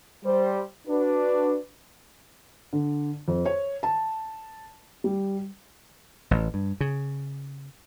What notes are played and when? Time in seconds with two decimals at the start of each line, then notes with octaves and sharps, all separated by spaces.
0.24 G3 C5
0.88 D4 F#4 B4
2.73 D3
3.28 F2
3.45 C#5
3.83 A5
5.04 G3
6.31 A1
6.54 G2
6.81 C#3